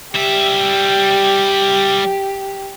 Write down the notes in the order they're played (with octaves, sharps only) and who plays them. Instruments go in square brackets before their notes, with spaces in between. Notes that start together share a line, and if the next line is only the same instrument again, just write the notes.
[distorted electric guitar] G3 E5 [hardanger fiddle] G4